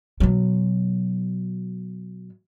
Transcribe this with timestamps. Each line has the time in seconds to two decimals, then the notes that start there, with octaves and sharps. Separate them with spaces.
0.20 B2 F#3